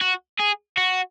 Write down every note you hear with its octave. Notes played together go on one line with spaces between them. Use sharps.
F#4
G#4
F#4